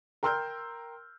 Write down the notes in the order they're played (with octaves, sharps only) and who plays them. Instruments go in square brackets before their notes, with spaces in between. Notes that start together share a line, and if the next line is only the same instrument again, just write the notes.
[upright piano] A#4 G5 C6 E6 F6 G6